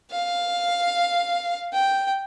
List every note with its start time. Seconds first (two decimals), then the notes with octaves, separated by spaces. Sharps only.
0.11 F5
1.73 G5